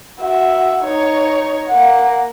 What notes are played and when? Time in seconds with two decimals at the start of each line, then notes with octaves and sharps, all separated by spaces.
0.20 F#4 E5
0.83 D#4 C#5
1.69 A#3 F#5